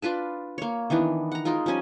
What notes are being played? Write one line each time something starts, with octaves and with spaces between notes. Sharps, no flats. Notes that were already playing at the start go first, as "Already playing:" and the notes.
D4 F4 B4 A5
A#3 C#5
D#3 E3 B3 D4
F#5 A#5
G#3 D#4 F4 A#4
F3 G3 C#4 G#5